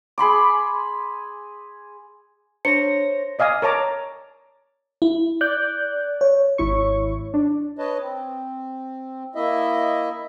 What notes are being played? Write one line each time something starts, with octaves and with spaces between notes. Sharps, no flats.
G#4 B5 C6 D6
D4 C5 C#5 A#6 C#7
D5 D#5 F5 G#5 D#6
A#4 C#5 A5 A#5 D6
E4
D5 F#6 G6
C#5
G#1 E4 C#6
D4
B4 C#5 D#5 A5
C4
A#3 E4 D#5 E5